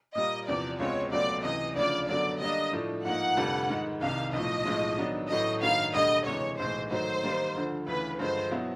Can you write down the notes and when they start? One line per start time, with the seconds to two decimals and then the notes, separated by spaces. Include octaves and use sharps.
0.15 A#2 G3 A#3 D#5
0.48 E2 C3 F3 D5
0.80 C#2 B2 G#3 C4 F4 C#5
1.11 C#2 B2 F#3 A3 C4 D5
1.43 C#2 C3 E3 D#5
1.76 D2 C#3 F3 D5
2.08 F#2 D3 F#3 B3 D5
2.41 D3 G3 A#3 D4 D#5
2.73 A2 F3 A3 D4
3.04 G#2 F3 A#3 D#4 F#5
3.37 F1 F2 D3 G3
3.69 G#2 D#3 G#3
4.01 C2 C3 D#3 F5
4.33 B1 A2 F3 D#5
4.65 B1 A2 F3 G#3
4.98 D#3 F#3 B3 D4
5.29 A1 A2 F#3 A3 D#5
5.62 G2 D#3 F#3 A#3 F5
5.94 E1 D2 D3 G3 D#5
6.26 D2 C3 E3 G#3 C#5
6.58 B1 A2 E3 G#3 C5
6.90 G#2 D#3 F#3 A3 C5
7.23 D#3 G3 A#3
7.55 D2 D3 F3
7.87 D2 C#3 E3 B4
8.19 G2 D3 F3 G#3 C5
8.51 B2 F#3 B3 E4